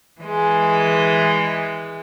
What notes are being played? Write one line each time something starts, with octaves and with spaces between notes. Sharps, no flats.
E3 G#3